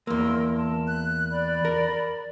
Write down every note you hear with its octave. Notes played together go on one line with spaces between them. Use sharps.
E2 A#3 A#4 C6 E6
A5
F#6
D5 B5
A#4